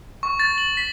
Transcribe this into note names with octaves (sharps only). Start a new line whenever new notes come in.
C#6
A6
F#7
B6